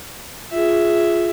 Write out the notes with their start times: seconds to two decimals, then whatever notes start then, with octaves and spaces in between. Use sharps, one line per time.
0.51 F4 G#4 E5